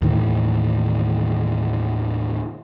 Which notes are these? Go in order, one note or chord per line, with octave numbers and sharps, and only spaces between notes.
D#2 A2 D#3 E3